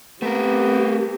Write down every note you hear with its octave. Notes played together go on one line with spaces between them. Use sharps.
A3 B3 C4 G4 A#4